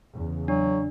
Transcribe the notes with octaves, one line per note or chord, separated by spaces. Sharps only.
E2 C#3
F#3 D4